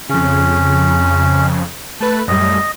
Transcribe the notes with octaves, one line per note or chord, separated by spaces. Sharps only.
F2 C#3 C#4
A3 B4 A5
F#2 A2 G3 D#5